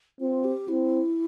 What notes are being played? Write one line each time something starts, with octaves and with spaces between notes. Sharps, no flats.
C4 F4
G4
C4 E4